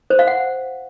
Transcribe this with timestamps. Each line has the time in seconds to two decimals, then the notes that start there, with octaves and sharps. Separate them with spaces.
0.10 C5
0.19 F5
0.27 F#5